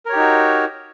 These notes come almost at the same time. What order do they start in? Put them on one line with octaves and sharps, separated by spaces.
A#4 C#5 G4 D#4 F#4